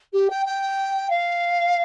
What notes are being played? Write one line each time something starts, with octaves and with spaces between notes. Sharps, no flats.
G4
G5
G5
F5